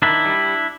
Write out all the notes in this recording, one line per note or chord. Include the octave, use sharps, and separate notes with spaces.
D#3 D4 E4
G3